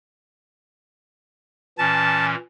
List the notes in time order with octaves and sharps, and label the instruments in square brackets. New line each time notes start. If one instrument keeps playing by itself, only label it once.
[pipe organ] A#2 E3 C#4 [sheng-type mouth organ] A5